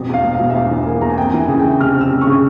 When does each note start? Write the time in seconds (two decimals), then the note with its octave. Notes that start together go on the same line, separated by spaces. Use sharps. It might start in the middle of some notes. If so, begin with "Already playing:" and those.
Already playing: E1 F2
0.09 E2
0.14 F5
0.23 E1
0.34 F5
0.39 E1
0.50 E5
0.55 E2 F5
0.71 E3
0.86 A#3
1.01 E2 A#5
1.10 G#5
1.17 F2 G5
1.34 E3
1.39 G#5
1.48 C#3
1.59 G5
1.64 E3
1.80 F1 F6
1.95 F2
2.01 E6
2.12 F2
2.21 C#6
2.26 C#3